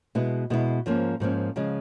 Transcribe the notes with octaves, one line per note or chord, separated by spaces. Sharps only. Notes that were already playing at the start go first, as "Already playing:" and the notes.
B2 G#3 B3 E4
B2 G#3 B3 E4
G#2 F3 A#3 C#4
G#2 F3 A#3 C#4
C#3 F3 G#3